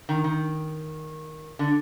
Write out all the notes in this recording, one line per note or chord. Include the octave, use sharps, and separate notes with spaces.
D#3
D#3
D3